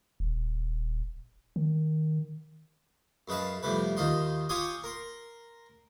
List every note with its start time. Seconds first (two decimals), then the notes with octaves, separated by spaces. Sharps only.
0.20 D#1
1.56 D#3
3.28 F#2 G#3 B4 F5 A5
3.63 F2 A2 C3 G3 B4
3.97 D#2 D#3 F4 D#5 C6
4.49 F4 G4 C#5 G#5 C6 D#6
4.84 A#4 C6